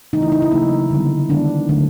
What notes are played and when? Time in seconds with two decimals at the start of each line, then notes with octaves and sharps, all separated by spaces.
0.13 C#3 E3 A3 D#4
0.22 E4
0.32 D#4
0.42 E4
0.51 C#3 F#3 A#3 D#4
0.91 D3 G3 B3
1.29 D#3 G#3 B3 D4
1.69 D3 F#3 A3